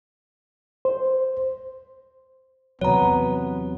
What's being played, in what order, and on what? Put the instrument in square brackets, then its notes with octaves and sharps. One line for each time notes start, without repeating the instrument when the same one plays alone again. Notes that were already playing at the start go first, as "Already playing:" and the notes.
[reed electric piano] C5
[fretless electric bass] E2 C3 F#3 [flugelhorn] B3 [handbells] C#5 A#5